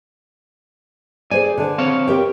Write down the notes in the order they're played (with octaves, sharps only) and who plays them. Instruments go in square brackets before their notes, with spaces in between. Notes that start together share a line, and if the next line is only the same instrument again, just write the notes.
[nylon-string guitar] G#4 C5 D5 [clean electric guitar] G#5
[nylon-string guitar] D3 D5
[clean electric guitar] C4 C#5 F5
[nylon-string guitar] G4 A#4 G5